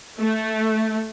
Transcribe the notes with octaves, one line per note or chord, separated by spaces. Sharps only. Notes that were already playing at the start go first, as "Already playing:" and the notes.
A3